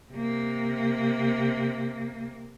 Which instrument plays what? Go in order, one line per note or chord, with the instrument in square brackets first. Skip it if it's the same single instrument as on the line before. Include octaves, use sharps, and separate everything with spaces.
[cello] C3 A#3